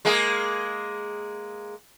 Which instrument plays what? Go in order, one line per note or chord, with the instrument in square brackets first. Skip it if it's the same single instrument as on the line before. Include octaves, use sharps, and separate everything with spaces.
[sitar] G#3 A#3 G#4